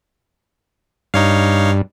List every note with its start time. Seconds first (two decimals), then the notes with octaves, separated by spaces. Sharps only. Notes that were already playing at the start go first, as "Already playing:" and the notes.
1.14 G2 D#4 C#5 F5